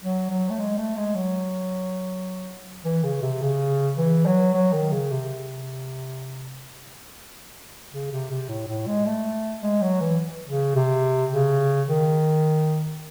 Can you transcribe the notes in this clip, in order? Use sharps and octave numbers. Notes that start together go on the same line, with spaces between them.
F#3
F#3
A3
G#3
A3
G#3
F#3
E3
C#3
C3
C#3
E3
F#3
F#3
D#3
C#3
C3
C#3
C3
C3
A2
A2
G#3
A3
G#3
F#3
E3
C#3
C3
C#3
D#3